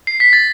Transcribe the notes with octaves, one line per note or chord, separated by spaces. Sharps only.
C7
B6
A6